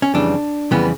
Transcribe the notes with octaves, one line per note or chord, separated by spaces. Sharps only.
C#4
F2 C#3 E3 G3 D4
F2 C#3 E3 G3 B3